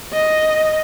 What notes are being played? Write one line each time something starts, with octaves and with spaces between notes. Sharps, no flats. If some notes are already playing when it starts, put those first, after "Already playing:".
D#5